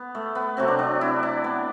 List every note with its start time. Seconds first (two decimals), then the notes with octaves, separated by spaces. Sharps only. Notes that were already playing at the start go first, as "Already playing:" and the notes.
Already playing: B3
0.15 A3
0.35 B3
0.57 C3 F#3 A3 C4
0.68 D4
0.79 D4
1.01 E4
1.23 D4
1.44 B3